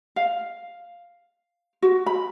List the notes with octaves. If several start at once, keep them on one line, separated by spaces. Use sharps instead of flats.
F5
F#4
B5